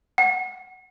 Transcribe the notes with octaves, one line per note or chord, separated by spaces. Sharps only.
F#5